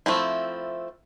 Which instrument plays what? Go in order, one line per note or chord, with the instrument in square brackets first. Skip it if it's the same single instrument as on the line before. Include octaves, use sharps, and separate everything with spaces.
[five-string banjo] F3 A3 C4 E4